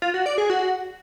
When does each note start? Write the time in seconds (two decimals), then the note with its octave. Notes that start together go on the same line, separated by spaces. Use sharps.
0.02 F4
0.14 F#4
0.26 D5
0.38 G#4
0.50 F#4